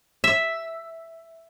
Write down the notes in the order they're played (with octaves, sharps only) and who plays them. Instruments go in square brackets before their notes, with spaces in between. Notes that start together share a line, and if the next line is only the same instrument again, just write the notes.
[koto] E5